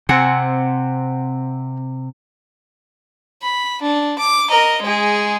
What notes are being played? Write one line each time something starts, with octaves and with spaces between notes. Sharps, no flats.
C3 C4 F#5 G#5
B5
D4
D6
A#4 D#5
G#3 G#4